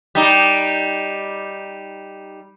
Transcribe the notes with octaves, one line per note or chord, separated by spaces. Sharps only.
G3 D#4